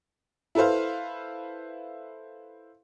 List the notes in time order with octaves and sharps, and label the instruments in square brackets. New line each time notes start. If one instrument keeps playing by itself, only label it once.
[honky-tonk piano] E4 A4 B4 C5 F5